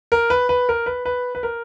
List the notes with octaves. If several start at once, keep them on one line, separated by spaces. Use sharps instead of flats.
A#4
B4
B4
A#4
B4
B4
B4
A#4